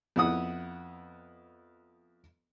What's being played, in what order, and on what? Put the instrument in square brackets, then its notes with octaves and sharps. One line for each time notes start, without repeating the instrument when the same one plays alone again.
[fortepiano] F2 B3 E4 F#5 D#6